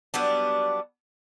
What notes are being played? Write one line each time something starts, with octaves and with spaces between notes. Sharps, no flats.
F#3 G3 B3 D4